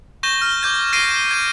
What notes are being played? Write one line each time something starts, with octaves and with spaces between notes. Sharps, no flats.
C#6 G6 A#6 E7 G7
F6
D6 G6 G#6
F6 A#6 C7 D7 D#7
G#6 D#7